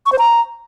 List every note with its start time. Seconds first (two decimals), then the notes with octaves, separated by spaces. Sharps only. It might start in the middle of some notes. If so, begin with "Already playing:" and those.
0.06 C#6
0.12 C5
0.19 A#5